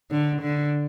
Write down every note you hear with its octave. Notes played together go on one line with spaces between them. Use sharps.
D3
D3